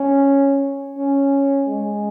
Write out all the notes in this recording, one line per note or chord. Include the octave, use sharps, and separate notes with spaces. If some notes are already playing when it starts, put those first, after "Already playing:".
Already playing: C#4
C#4
G#3